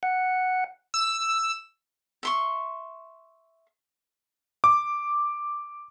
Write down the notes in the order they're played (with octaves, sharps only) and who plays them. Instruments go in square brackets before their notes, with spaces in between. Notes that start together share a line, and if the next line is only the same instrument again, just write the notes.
[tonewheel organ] F#5
[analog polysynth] E6
[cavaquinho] E5 C6 C#6
[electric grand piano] D6